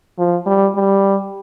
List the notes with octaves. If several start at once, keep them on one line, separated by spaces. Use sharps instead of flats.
F3
G3
G3